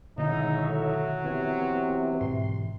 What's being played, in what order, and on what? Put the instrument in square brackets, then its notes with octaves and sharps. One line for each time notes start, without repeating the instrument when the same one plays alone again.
[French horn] G#2 [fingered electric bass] B2 D3 D#3 [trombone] D#4 [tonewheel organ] E4 C#5 E5
[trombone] F#3 [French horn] A3
[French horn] C3 [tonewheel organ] E3 B3
[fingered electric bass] G#2 B2 E3 [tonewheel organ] C6